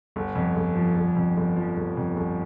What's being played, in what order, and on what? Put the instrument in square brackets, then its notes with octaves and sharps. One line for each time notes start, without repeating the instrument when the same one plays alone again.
[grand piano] G1
F2
G1
F3
G1
F2
G1
F3
G1
F2
G1